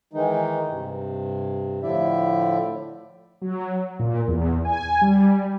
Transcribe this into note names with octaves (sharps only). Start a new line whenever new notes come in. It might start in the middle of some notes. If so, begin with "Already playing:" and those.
D#3 E3 G#3 D#4
G2 C3
A2 D3 F3 E4 D5 E5
F#3
A#2
E2
G#5
G3